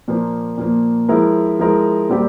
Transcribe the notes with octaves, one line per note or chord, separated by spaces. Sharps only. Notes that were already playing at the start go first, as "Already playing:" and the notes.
A#2 F3 A#3
A#2 F3 A#3
F3 G#3 E4 A#4
F3 G#3 E4 A#4
A#2 G3 C4 G4 A#4